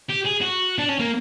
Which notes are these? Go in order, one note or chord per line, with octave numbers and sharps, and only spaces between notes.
G4
G#4
F#4
D4
C#4
A#3